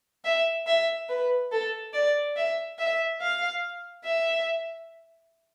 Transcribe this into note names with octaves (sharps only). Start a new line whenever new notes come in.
E5
E5
B4
A4
D5
E5
E5
F5
E5